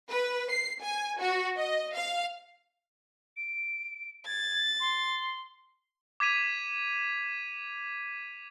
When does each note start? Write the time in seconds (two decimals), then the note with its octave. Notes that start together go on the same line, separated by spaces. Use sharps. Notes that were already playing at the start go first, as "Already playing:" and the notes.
0.10 B4
0.51 C7
0.82 G#5
1.20 F#4
1.57 D#5
1.94 F5
3.37 D7
4.27 G#6 A6
4.80 C6
6.20 D6 G#6 B6 D#7 F7